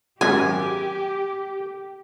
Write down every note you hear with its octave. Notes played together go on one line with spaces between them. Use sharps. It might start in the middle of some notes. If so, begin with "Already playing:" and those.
G#1 F#2 G4 G#5